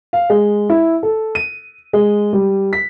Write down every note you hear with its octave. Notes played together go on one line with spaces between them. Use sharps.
F5
G#3
E4
A4
D#7
G#3
G3
B6